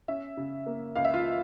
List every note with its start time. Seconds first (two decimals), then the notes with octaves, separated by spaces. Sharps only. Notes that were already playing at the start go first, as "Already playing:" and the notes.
0.08 C#4 E5
0.37 C#3
0.66 A#3
0.96 C#2 F5
1.05 E5
1.14 F4 F5